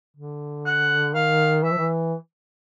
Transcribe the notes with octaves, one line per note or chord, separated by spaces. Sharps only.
D3
F#5
D#3 F5
E3 E5
F3
E3